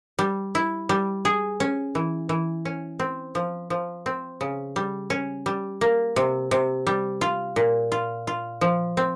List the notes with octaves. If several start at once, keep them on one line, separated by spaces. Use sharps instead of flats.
G3
E4
G3
G#4
C#4
E3
E3
C#4
C4
F3
F3
C4
C#3
G3
C#4
G3
A#3
C3
C3
G3
F4
A#2
F4
F4
F3
C4